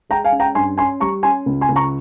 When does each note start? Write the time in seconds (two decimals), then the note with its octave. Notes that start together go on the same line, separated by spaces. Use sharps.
0.09 G#3 G5 A#5
0.25 F5 G#5
0.32 C#4
0.40 G5 A#5
0.55 G2 G#5 C6
0.77 C#4 G#5 C6
1.00 G3 A#5 C#6
1.23 C#4 G#5 C6
1.46 C#2
1.61 G#5 C6
1.69 C#2
1.76 A#5 C#6